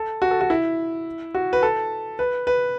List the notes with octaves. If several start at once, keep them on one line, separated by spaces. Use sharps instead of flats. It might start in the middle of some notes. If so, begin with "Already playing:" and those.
Already playing: A4
F#4
A4
F#4
E4
F#4
B4
A4
B4
B4